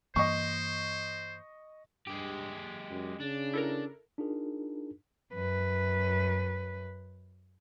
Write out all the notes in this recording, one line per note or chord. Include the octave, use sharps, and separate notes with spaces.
G2 E3 A#3 C5 D#5 C#6
G2 G#3 G4
F#2
C#3 D4
E4 A4 A#4
D4 D#4 F4 G#4 A#4
F#2 B4